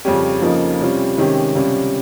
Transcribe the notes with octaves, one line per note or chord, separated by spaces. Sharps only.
F2 C#3 G3 C#4 G4
F2 C#3 F3 A#3 D#4
C3 G3 C#4 F4
C3 D#3 G#3 C#4 G4
C#2 C3 G3 C#4